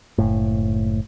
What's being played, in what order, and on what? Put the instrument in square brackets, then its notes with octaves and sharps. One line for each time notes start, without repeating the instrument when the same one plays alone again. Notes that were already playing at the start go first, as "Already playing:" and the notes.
[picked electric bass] F#1 A2